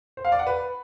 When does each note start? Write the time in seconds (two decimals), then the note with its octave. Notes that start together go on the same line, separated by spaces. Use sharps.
0.17 C5
0.25 F5
0.32 D5
0.39 F#5
0.47 B4